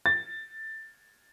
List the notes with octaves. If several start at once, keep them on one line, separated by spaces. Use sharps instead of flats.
A6